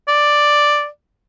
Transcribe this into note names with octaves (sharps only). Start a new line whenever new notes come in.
D5